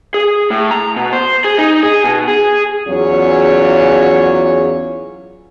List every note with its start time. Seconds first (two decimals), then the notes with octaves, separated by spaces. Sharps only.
0.14 G#4
0.50 A2
0.71 A#5
0.96 B2
1.13 C5
1.45 G#4
1.58 D#4
1.83 G#4
2.04 B2
2.28 G#4
2.87 E2 F#3 C#4 F4 G#4 C#5